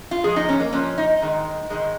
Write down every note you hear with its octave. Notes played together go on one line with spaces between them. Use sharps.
F4
A#2 F3 G#3 G#4
D#4
C#4
A#3
A#2 F3 G#3 C#4
D#4
G#2 D#3 G#3
G#2 D#3 G#3